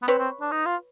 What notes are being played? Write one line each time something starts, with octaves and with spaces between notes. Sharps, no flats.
B3
C4 B4 C#5
C4
D4
D#4
F4